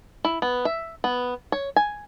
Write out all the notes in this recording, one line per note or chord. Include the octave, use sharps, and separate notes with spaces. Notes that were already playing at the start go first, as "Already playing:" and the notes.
E4
B3
E5
B3
C#5
G#5